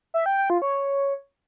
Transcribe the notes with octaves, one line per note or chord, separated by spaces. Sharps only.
E5
G5
G5
F4
C#5